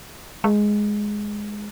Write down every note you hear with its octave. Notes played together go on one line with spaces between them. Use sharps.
G#3